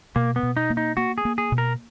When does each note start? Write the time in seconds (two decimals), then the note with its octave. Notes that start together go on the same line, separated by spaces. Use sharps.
0.16 B2 A#3
0.36 B3
0.43 B2
0.57 D#4
0.70 A#3
0.77 D#4
0.97 A#3 F#4
1.18 G#4
1.25 A#3
1.38 G#4
1.52 B2
1.58 A#4